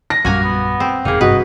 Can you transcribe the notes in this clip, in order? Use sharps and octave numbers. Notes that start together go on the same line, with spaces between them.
A#6
A#1 F#2 G3 A#3 F#4 G#5 A#5
B3
C4
E1 A#3 D#4 G#4
G#1 G2 C3 F#4 B4 D#5